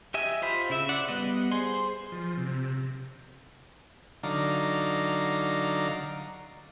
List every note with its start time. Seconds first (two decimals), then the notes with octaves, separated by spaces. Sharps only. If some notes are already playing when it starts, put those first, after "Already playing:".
0.14 G4 D#5 E5 G#5
0.42 F4 C5 B5
0.70 C#3 E4 E5
0.89 D5 F#5
1.08 G3 B3 D#5
1.52 G#4 C5 C6
2.12 F3
2.37 C3
4.23 D3 F#3 D#4 D5 F5 A#5